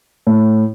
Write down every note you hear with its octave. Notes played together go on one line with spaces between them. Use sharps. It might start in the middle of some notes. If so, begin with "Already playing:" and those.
A2